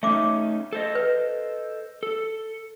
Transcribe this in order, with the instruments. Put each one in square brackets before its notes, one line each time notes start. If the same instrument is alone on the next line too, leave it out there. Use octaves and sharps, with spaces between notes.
[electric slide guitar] A3 C#4 D#4 [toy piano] E5 D6
[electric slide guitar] A4 C5 D#5
[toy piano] B4
[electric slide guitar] A4